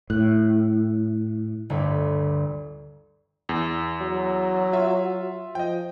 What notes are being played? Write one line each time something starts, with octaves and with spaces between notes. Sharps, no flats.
A2 F#6
G1 D2
E2
F#3
F4 E5
F3 D#5 G5